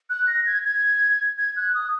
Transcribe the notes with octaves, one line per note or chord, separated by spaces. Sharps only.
F#6
A#6
G#6
G#6
G#6
F#6
D#6